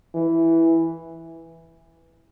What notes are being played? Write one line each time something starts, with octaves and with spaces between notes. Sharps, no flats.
E3